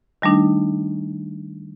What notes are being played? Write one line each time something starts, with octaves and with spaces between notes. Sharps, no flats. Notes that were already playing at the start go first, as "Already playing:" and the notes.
D#3 G3 A3 D4 D#4